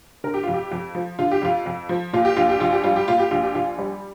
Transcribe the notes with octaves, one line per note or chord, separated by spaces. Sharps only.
D3 A#4
G4
F2 F4
G4
F2
F3
D3 F4
G4
F2 F4
F2
F3
A#2 F4
G4
A#1 F4
G4
A#1 F4
G4
G3 F4
G4
A#2 F4
G4
A#1 F4
G4
A#1 F4
G3